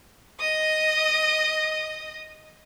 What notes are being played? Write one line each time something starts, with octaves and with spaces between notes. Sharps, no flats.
D#5 D#6